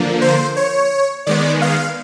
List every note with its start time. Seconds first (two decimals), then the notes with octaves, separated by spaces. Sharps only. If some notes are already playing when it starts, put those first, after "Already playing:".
Already playing: D3 F3 A#3
0.22 C5
0.56 C#5
1.26 D#3 G#3 B3 D5
1.62 F5